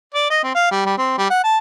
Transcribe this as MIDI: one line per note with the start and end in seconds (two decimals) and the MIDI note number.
0.15 0.28 74
0.30 0.43 75
0.44 0.54 60
0.55 0.70 77
0.71 0.82 55
0.86 0.97 55
0.98 1.15 60
1.18 1.28 55
1.30 1.40 78
1.44 1.58 81